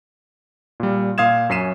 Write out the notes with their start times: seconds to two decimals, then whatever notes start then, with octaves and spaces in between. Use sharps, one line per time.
0.80 A#2 G3
1.18 A#2 F4 F5 D#6 G#6 E7
1.49 F#2 C#4 B6 C7 D#7 E7